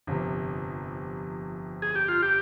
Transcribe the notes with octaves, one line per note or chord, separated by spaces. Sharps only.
G1 F2 C3
G#4
G4
F4
G4